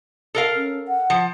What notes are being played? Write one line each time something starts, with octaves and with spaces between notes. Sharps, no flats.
A4 A#4 F5
C#4
F#5
F3